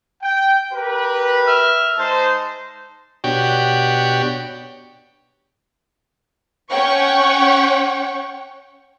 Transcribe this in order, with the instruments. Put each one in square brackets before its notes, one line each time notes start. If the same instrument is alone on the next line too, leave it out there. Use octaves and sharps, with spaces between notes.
[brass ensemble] G5
G4 A#4 B4
[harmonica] E5 F6
[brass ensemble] G#3 D#4 C5 [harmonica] A5
[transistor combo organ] B2 D4 F#4 G4 C#5 G5
[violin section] C#4 C#5 F#5 G5 C#6